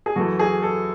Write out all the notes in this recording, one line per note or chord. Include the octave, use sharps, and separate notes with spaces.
G#4
F#2 E3 A3 F#4
G#4
A4